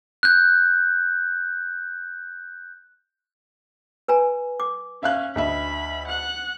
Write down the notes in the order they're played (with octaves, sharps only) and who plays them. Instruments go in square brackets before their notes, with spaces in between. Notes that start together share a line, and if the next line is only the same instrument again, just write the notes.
[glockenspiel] F#6 G6
[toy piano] B4 G#5 A#5
D6
[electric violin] C#4 [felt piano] E5 F5 F#6
[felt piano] D2 D#5 E5 [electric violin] B5
[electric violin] F#5 F#6